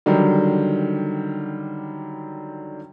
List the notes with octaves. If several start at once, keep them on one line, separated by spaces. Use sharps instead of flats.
D3 D#3 F#3 G3